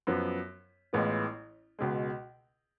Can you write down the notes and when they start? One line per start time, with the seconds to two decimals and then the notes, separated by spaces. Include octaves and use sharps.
0.07 F#2 F3 B3
0.93 A1 A2 G#3 B3 F4
1.79 C#2 B2 G#3